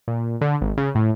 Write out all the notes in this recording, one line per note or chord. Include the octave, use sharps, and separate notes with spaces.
A#2
D3
G#1
C#3
A2